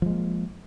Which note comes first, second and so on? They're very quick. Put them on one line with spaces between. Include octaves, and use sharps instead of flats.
F3 G#3 A#3